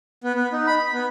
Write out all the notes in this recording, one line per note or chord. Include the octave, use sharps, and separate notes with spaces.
B3
B3
D#4
B5
B5
B3